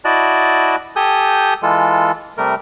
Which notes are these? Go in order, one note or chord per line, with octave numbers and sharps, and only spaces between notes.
E4 F#4 D5 D#5 A5 F#6
G4 A4 G#5 D#6 G6
E3 G#3 F4 A4
C3 G3 A3 A#4